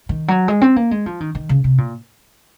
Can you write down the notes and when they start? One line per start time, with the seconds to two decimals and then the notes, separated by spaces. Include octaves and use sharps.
0.09 D#3
0.28 F#3
0.48 G#3
0.61 C4
0.76 A#3
0.91 G#3
1.06 F3
1.20 D#3
1.35 D#3
1.49 C#3
1.64 C3
1.78 A#2